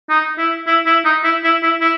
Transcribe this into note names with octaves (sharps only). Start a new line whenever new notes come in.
D#4
E4
E4
E4
D#4
E4
E4
E4
E4